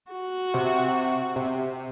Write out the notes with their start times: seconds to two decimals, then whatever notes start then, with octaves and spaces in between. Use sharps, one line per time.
0.12 F#4
0.54 C3
1.36 C3